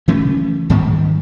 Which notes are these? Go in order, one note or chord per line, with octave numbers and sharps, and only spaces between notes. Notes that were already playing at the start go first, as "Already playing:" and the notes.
C#3 E3 A3 C#4
G#2 D#3 G3 B3